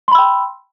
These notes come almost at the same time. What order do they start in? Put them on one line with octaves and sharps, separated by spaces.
C6 B5 E6 G5